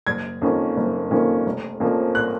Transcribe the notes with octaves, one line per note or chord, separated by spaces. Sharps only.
F#1 G#6
F2 D#3 A#3 C#4
F#1
F2 D#3 A#3 C#4
F1
F2 F3 A#3 C#4
F#6